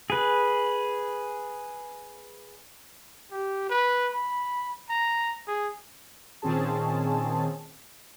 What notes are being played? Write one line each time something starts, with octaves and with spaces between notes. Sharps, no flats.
G#4 B4
G4
B4
B5
A#5
G#4
A#2 D#3 C4 C#4 G#4 A5